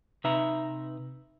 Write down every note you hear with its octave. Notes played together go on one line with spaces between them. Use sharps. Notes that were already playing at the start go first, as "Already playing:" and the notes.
C3 D#4 B4 E5 A#5